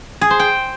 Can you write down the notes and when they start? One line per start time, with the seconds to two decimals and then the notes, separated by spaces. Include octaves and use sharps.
0.21 G#4
0.30 C5
0.40 G5